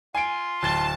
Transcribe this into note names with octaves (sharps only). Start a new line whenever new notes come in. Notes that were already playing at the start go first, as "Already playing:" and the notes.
F4 G#5 C6 D7
D1 A5 A6 G7